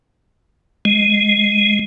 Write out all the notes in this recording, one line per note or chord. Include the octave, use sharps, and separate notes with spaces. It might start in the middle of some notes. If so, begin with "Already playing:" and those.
G#3